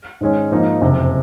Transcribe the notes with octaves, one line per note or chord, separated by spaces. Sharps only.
G#2 D#3 G#3 C#4
G#2 F3 A#3 D#4
F#1 F2 C3